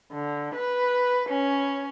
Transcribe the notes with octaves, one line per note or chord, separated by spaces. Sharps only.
D3
B4
C#4